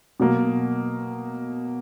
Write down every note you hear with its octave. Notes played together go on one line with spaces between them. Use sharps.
B2 F#3 A#3